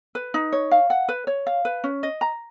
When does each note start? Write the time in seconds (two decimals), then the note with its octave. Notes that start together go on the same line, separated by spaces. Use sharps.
0.15 B4
0.34 D#4
0.52 C#5
0.71 F5
0.90 F#5
1.09 B4
1.27 C#5
1.47 F5
1.65 B4
1.84 C#4
2.03 D#5
2.21 A#5